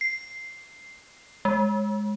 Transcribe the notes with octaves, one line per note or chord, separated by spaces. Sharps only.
C7
G#3